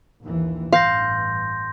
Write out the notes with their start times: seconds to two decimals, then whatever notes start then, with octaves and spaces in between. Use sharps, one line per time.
0.23 A#1 D#2 E3
0.72 A1 G2 F5 C6 G6 A#6